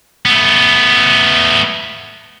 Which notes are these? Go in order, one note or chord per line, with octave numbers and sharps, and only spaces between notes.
A3 B3